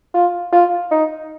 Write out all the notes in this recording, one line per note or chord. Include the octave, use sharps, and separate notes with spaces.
F4
F4
D#4